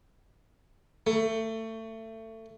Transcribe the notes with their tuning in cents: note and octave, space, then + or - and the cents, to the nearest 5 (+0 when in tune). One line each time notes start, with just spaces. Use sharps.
A3 +25